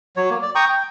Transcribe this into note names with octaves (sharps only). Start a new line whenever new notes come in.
F#3 C#5
A#3
D5
G5 A#5 C#6 D#6
G5